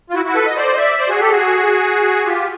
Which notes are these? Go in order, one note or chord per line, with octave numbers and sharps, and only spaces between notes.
F4
E4 F#4
E4 F#4
A4 B4
D#5
C5 D5
D#5
D5 E5
C5 D5
F#4 G#4
G4 A4
F#4 G#4
F4 G4